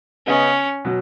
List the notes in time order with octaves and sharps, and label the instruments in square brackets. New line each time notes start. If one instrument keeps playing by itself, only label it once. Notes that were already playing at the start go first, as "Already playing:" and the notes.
[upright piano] C#3 B3 G#4 B4 D#5 [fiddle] C#4
[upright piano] B2 F#3